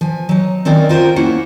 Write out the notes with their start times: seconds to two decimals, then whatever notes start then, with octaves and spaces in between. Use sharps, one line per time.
0.01 F3 G#5
0.29 F#3 D#4
0.65 D#3 C4 C#4 D#4 A#4 D5
0.89 F4 F#4 A#4 C5 E5 G5
1.16 A#3 C#4 E4 F#5